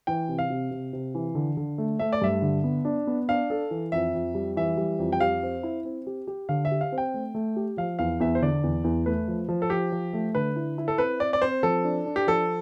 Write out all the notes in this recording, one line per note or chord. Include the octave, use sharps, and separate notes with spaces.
E3 G5
C3
F5
C3
C3
C3
E3
D3
D3
A3
A3 E5
D5
G2 E5
D3
B3
D4
B3
D4 F5
A4
E3
F2 E5
F2
G3
E3 E5
G3
F2
G5
G4 F5
C4
E4
C4
G4
G4
D3 F5
E5
G4
F5
C4
G5
A3
A3
G4
F3 F5
E2 F5
E2 E5
C5
D3 D5
E2
E2
A3 B4
F3
F3
A4
F3 G4
F3
A3
D3 B4
E4
E4
A4
C4 B4
C4 D5
D5
C4 C5
F3 A4
D4
D4
G4
F3 A4